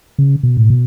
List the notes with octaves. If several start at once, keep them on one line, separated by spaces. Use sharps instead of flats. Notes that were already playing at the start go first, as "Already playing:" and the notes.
C#3
B2
A2
B2